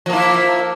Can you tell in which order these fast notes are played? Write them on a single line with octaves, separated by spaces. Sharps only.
F3 A#3 E4